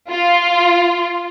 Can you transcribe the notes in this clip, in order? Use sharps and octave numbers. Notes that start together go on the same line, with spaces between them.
F4